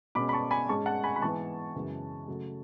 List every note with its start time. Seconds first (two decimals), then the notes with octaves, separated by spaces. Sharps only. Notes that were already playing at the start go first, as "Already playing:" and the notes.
0.15 B2 G#3 C#4 B5 D6
0.29 B5
0.33 A5 C#6
0.51 G#5 B5
0.69 G#2 G#3 C#4 A5 C#6
0.86 F#5 A5
1.04 G#5 B5
1.16 B5
1.21 G#2 E3 B3 A5 C#6
1.75 F#2 C#3 E3 G#3
2.28 C#3 F#3 A3